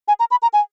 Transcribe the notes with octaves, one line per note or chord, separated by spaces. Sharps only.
G#5
A#5
B5
A#5
G#5